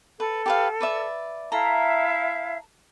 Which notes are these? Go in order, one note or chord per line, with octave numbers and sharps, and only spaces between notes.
A4 B4
G4 B4 F5
B4 D5 E5
E4 A4 E5 F5 A#5